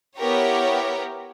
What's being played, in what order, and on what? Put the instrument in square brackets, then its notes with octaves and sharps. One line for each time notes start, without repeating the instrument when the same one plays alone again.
[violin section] B3 E4 G4 A#4 C#5